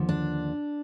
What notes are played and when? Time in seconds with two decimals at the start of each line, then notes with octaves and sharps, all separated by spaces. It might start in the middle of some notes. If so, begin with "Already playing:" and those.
Already playing: D#2 D3 F3
0.09 D4